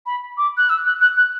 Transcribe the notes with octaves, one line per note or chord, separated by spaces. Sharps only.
B5
D6
F#6
E6
F#6
F#6
F#6